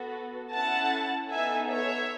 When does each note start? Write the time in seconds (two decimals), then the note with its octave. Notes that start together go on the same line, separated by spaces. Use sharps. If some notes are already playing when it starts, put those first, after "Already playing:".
Already playing: B3 F#4 A4
0.53 C#4 E4 A4 F#5 A5
1.30 B3 D#4 A4 E5 G#5
1.68 C#5 E5